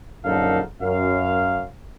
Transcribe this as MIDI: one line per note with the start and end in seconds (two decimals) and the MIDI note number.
0.25 0.59 34
0.25 0.59 42
0.25 0.59 50
0.25 0.59 63
0.25 0.59 69
0.25 0.59 77
0.82 1.64 42
0.82 1.64 77